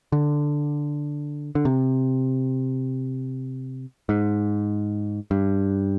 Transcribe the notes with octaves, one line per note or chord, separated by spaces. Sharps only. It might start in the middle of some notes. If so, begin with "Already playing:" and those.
D3
D3
C3
G#2
G2